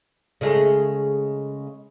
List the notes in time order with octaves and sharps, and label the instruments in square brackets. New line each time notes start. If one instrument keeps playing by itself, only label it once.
[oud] C#3 G#3 A3